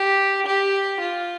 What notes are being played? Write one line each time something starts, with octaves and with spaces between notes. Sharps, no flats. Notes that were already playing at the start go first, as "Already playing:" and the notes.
Already playing: G4
G4
F4